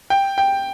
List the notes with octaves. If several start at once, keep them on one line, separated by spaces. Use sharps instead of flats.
G5
G5